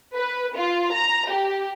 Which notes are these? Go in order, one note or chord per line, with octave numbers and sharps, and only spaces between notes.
B4
F4
A#5
G4